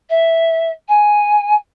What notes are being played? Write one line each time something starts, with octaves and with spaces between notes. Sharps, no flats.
E5
G#5